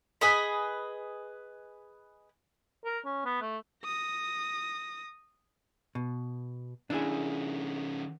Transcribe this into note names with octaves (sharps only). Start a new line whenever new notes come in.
G#4 B4 D#5 B5
A#4
C#4
B3
A3
D#6 A#6
B2
D#3 C#4 D4 E4 G#4